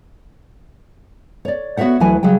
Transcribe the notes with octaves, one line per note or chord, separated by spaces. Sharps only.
C#5 D5
B3 F#4 G4 C#5 E5 F#5
D2 E3 F#3 B4 G#5
C#3 F#3 G3 G#4 G5